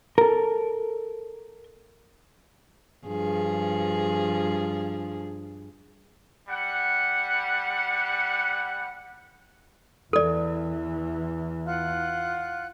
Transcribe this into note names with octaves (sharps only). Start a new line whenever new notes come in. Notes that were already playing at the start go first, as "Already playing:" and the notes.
A4 A#4
G2 F3 G#4
G3 F#5
E2 E3 A4 D5
F4 F#5 F#6